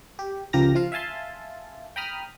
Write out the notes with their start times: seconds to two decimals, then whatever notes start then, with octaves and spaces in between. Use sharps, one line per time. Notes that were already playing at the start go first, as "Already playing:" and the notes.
0.19 G4
0.53 C#2 F3 G4 A#4 A#5 A#6
0.75 F3 F4 F5
0.92 E5 F5 G#5 A5 C6
1.96 G5 A#5 B5 D#6 F6